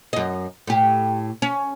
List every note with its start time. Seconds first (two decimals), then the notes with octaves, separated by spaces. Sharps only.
0.13 F#2 D#5
0.67 A2 G4
1.42 C#4